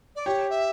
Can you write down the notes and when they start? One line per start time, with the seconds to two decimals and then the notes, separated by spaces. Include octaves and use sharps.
0.16 D5
0.26 G4 C#5
0.50 E5